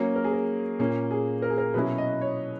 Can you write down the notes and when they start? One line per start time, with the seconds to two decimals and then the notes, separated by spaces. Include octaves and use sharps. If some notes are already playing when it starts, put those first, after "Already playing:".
Already playing: F#3 A#3 C#4 C#5
0.16 A#4
0.24 G#4
0.33 A#4
0.79 A#2 A#3 C#4
1.11 G#4
1.42 A#4
1.50 G#4
1.58 A#4
1.74 B2 F#3 C#4 E4 B4
1.98 D#5
2.21 C#5